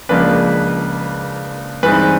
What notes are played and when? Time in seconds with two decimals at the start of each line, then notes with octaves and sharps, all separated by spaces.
0.09 C#2 C#3 F3 A#3 D4 B4
1.83 G2 E3 G#3 C4 D#4 B4